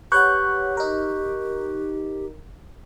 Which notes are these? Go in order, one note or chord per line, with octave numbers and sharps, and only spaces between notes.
G4 B4 C#5 F#5 C#6 F#6 G6
D#4 A#4